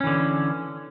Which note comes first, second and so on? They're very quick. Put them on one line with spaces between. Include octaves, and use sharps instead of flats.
C#4 E3 D3